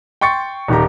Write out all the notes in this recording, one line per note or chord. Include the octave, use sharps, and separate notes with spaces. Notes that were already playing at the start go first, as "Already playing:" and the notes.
G5 C6 C#6 A6 C#7
D#1 D#3 G4 A#5